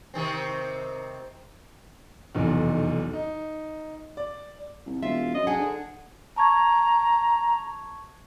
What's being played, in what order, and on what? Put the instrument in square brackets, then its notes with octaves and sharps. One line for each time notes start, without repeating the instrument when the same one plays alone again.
[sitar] C3 D#3 C4
[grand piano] F1 B1 E2
D#4
D5
[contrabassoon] C2
[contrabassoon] E1 [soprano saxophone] F4 [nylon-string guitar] E5
[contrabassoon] F#2 [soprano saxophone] D#5
[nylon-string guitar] D4 F#5 [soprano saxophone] G#4
[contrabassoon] D3
[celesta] A5 C#6 G#6 [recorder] A#5